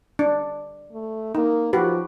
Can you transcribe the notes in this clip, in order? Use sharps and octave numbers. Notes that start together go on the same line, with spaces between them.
D4
A3
A#3 D#4
F3 F#4 G4 B4